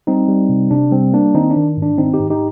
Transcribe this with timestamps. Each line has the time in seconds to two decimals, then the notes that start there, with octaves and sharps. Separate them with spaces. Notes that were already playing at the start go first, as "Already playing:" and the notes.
0.07 G3 C4 D#4
0.28 G3
0.49 C3
0.71 C3 D4
0.92 G3 C4
1.13 A#3 D4
1.35 D#3 C4 D#4
1.50 D4
1.56 D#3
1.77 G#2
1.82 D4
1.98 D#3 C4 D#4
2.14 D#4 G4
2.20 G#2
2.30 D#4 G4